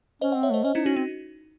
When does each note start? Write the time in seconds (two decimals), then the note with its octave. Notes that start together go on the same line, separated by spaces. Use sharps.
0.21 C#4 C5 D#5
0.32 D#5 F#5
0.35 C4
0.43 C#5 E5
0.51 A3 C5 D#5
0.64 C#4 C5 D#5
0.75 C#4 D#4 E4
0.85 C#4 D#4 F#4
0.96 C4 D#4